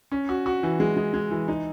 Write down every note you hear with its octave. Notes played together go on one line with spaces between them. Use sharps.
C#4
F#4
F#4
E3
G#3
G#3
G#3
E3
D#4